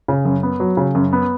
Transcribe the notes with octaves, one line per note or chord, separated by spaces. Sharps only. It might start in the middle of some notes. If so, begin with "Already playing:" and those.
C#3
F#2
B3
F#3
C#3
F#2
B3